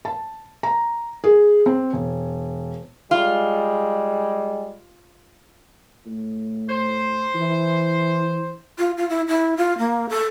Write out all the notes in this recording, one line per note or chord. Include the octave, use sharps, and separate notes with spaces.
A5
A#5
G#4
C4
E1
G3 G#3 F4
A2
C5
E3
F4
F4
E4
E4
F4
A#3
A4